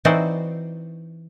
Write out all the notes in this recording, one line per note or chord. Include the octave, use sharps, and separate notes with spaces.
E3 C4 D#4 F#4 C5 D5